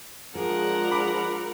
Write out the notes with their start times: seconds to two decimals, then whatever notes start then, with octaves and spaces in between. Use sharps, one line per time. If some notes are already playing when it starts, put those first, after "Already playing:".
0.35 F3 G#3 D4 G#4 A#4 F#5
0.91 B5 D6